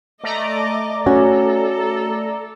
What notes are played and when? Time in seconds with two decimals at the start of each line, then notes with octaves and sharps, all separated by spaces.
0.24 A3 D5 D#5 A#5 D6
1.06 C#4 F#4 A4